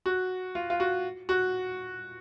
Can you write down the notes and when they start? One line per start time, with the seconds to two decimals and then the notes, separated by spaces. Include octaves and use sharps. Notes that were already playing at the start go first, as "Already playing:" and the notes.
0.06 F#4
0.55 F4
0.70 F4
0.80 F#4
1.29 F#4